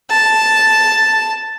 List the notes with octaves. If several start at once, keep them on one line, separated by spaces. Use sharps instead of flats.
A5